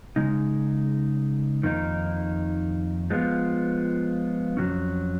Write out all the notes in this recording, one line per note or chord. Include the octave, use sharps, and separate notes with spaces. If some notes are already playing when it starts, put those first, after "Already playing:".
C#3 G#3 D#4
F2 D#3 A#3 D#4
F3 G#3 B3 F4
F2 D#3 F#3 C#4